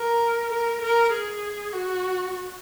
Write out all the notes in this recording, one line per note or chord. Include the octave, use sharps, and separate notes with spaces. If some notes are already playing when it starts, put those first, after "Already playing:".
Already playing: A#4
A#4
A#4
G#4
F#4